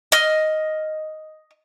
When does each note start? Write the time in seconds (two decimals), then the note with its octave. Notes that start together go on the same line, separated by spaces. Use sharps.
0.12 D#5 F6